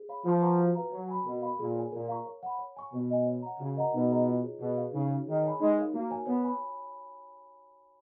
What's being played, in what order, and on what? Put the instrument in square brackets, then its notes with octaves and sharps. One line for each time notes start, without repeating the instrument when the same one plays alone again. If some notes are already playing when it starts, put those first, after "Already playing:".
Already playing: [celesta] G#4
C#5 F5 B5
[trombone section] F3 [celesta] F4
[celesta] B4 F#5 A#5 C#6
F#4
B4 F5 A#5
[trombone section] F#3 [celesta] C#5
[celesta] G#5 B5
[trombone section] B2 [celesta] A#4
[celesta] F5 B5
[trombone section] A#2 [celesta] G#4
[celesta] C#5 G#5
[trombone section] A#2 [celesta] A#4
[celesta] F5 A#5 C#6
C#5
F#5 B5
C#5
G#5 C#6
[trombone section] B2 [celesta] B4
[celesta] D#5 G#5
C#5
F#5 A#5
[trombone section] C#3 [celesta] F#4
[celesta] A#4 D#5 F#5 A#5
[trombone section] B2 [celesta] D#4
[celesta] G#4 B4 D#5 A#5
F4
G#4 C#5
[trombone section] B2 [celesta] G#4
[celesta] B4 F5
[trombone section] C#3 [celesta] D#4
[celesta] F#4 C#5
[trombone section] D#3 [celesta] G#4
[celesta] C#5 G#5 B5
[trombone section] G#3 [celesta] D#4
[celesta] A#4 C#5 F5
[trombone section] A#3 [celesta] F#4
[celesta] A#4 C#5 G#5
[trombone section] B3 [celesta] C#5
[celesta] G#5 B5